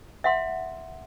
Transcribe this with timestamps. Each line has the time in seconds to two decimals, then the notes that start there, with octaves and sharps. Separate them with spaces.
0.24 E5 F#5 C6